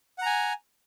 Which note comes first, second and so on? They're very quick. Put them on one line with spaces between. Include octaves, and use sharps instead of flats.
F#5 A#5 G#5